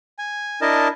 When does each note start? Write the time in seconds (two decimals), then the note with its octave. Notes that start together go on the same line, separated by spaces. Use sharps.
0.19 G#5
0.61 D4 E4 A#4 D#5 A5